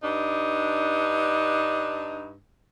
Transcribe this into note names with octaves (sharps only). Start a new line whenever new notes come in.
G2 D4 D#4